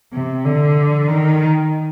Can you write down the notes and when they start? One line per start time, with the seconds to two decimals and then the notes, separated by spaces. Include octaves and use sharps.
0.13 C3
0.44 D3
1.08 D#3